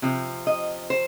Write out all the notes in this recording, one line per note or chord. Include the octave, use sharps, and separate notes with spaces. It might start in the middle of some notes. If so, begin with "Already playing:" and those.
C3 F3
D#5
C5